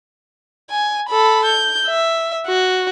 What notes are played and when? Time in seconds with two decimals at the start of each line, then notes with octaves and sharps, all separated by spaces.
0.70 G#5
1.08 A4 B5
1.45 G6
1.87 E5
2.47 F#4